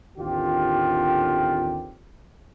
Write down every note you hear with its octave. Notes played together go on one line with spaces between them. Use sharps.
A1 D#2 D3 C4 F4 G4